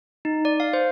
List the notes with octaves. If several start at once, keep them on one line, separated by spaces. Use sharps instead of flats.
D#4
D5
F5
C5